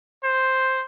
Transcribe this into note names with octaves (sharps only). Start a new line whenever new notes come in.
C5